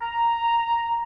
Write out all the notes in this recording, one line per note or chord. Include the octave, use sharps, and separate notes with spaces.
A#5